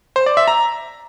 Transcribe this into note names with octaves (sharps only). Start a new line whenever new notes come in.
C5
D5
E5
A#5